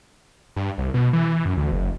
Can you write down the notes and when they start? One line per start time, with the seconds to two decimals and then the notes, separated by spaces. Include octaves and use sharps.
0.56 G2
0.78 C2
0.94 B2
1.13 E3
1.45 F#2
1.57 D2
1.72 F#1